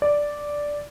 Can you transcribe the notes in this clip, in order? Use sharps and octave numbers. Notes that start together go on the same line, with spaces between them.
D5